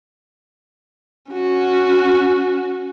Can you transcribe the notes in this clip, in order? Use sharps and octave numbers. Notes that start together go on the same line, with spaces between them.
C#4 F#4